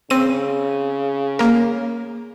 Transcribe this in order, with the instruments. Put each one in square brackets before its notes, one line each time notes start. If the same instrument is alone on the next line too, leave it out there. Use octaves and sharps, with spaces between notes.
[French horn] C#3 [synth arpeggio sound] C4 D#7
[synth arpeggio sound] A#3 A#4